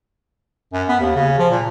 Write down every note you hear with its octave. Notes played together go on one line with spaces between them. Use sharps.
F#2
B3
D#2
C#3
F3
A#2